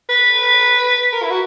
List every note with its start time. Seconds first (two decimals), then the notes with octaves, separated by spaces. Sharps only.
0.09 B4
1.13 A#4
1.23 E4
1.30 F#4